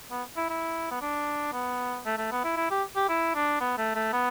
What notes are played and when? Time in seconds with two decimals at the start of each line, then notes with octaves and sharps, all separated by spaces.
0.11 B3
0.36 E4
0.49 E4
0.91 B3
1.01 D4
1.53 B3
2.06 A3
2.18 A3
2.32 B3
2.44 E4
2.57 E4
2.71 G4
2.96 G4
3.09 E4
3.35 D4
3.61 B3
3.78 A3
3.95 A3
4.13 B3